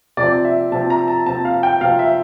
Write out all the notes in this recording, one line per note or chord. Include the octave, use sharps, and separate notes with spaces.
C3 F3 C4 D5
E5
C3 F3 C4 A5
A#5
A5
C3 F3 C4 A5
F5
G5
C3 F3 C4 F5
E5